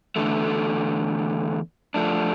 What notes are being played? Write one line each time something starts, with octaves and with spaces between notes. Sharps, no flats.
E2 D3 A3
F3 A3 D4